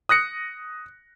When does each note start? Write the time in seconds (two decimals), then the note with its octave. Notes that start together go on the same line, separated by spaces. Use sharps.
0.09 D#6 F#6 A#6 C#7